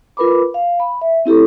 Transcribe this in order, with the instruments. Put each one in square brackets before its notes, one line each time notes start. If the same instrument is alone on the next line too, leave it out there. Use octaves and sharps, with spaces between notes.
[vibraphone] F4 A#4 B4 B5 D6
F5
B5
E5
C4 E4 G4 A4